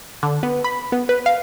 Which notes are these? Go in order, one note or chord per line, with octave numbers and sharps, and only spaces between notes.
D3
B3
B5
B3
B4
F5